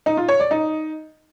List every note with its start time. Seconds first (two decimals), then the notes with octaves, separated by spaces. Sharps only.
0.06 D#4
0.17 F4
0.28 C#5
0.40 D5
0.51 D#4